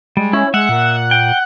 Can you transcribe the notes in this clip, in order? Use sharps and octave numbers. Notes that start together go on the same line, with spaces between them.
G3 G#3
C#4 E4
G#3 E5 F#5
A#2
G5